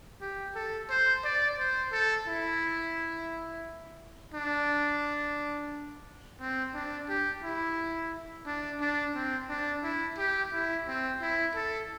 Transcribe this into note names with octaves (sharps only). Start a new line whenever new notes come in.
G4
A4
C5
D5
C5
A4
E4
D4
C4
D4
G4
E4
D4
D4
C4
D4
E4
G4
E4
C4
E4
A4